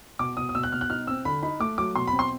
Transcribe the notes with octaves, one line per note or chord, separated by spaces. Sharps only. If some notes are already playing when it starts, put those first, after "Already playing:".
B2 D6
B2 D#6
D#6
B2 E6
F#6
B2 F6
F#6
D#4 F6
C4 E6
D3 B5
D#4 B5
A3 D6
F#3 D6
B2 C6
B5
C4
C6